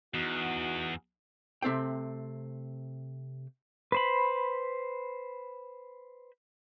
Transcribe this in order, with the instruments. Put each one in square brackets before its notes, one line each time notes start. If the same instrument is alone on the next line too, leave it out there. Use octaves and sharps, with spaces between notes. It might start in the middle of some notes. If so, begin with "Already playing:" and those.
[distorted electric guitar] E2 [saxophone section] B3 D#4 F#4
[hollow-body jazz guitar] C3 A3 C4 G5
[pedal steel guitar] B4 C5 B5